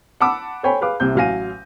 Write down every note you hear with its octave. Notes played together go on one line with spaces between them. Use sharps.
F#5 A5 B5 D6 E6
A4 C5 C#5 G5 G#5 B5
G#4 B4 F5 D6
C2 C3 G6
A1 F#3 F5 G#5 A#6 D#7